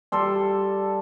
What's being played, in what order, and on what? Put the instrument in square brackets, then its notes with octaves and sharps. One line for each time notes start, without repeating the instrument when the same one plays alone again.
[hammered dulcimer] G3 A4 C6